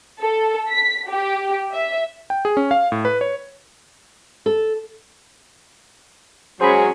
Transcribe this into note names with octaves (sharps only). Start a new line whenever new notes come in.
A4
B6
G4
E5
G5
G#4
C#4
F5
A2
B4
C#5
A4
F#3 G#3 C#4 G#4 C5 B5